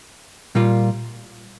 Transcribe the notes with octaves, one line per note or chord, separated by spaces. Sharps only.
A#2 G3 A#3 F4